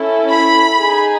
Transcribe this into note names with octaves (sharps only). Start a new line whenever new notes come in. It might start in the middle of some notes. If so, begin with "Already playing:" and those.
Already playing: C#4 E4 A4
B5
D#4 G#4